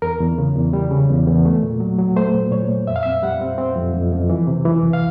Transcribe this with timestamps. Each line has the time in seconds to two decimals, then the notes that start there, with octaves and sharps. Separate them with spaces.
0.02 E2 A#4
0.20 E2
0.38 C#3
0.55 E2
0.73 G3
0.91 C#3
1.09 E2
1.27 E2
1.45 A3
1.63 A#2
1.80 F#3
1.99 F#3
2.16 A3 C5
2.34 A#2
2.51 A#2 C#5
2.69 A#2
2.87 F2 E5
2.96 F5
3.03 C4 E5
3.22 G3 F#5
3.41 C4
3.58 C4
3.76 F2
3.94 F2
4.12 F2
4.29 E3
4.47 C3
4.65 E3
4.83 C2
4.93 F5